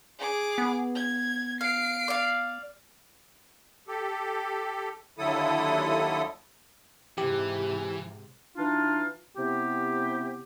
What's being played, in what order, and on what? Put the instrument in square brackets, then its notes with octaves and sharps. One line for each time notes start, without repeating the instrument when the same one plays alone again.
[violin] G#4 D6
[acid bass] B3
[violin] G#6
[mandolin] F5 [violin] C7 D7
[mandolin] D5 F5
[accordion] G4 A4
D#2 D3 F#3 E4 A4 D#6
[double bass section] G#2 C3 [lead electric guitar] E3 [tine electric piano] G4
[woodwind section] E3 D4 D#4 F4
C3 B3 E4 G4